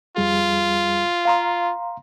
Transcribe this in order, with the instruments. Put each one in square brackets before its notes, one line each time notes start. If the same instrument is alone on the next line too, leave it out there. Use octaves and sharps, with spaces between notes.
[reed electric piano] F2 G3 G#4 [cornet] F4
[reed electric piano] F5 A#5 C6